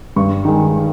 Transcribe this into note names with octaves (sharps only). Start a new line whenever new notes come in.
G2 C#6
D#3 G#3